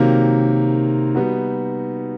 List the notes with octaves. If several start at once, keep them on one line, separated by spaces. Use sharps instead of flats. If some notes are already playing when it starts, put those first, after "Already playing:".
Already playing: C3 D#3 F#3 A#3
G3 B3 D#4 F#4